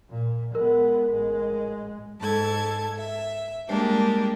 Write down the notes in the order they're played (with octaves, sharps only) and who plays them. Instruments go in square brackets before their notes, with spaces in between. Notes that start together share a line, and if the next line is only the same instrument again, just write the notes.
[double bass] A#2
[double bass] G#3 B3 [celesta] A#4
[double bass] A1 G#3
[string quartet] G#2 A4 A5 G#6
E5
G3 G#3 A#3 D4 G4